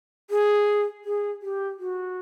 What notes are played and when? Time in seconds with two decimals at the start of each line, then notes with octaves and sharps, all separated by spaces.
0.30 G#4
1.05 G#4
1.42 G4
1.79 F#4